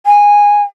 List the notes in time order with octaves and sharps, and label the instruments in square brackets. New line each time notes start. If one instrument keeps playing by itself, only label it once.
[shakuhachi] G#5